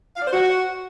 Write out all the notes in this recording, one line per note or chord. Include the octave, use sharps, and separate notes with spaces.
F5
D5
C5
F#4